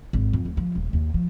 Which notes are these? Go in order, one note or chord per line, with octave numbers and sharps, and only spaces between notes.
G#1
F2
D2
F3
D#1
D#2
F3